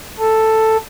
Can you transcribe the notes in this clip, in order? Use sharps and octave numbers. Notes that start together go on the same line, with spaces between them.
A4